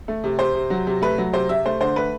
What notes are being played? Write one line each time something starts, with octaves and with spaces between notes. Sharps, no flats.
A3
C3
C3 C5
C3
F#3
C3
A3 B4
F#3
C3 C5
C3 E5
A3 C5
D3 C5
A3 B4